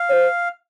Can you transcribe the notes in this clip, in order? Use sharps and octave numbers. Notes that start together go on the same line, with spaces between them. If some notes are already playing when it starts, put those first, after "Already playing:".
Already playing: F5
C#5
C5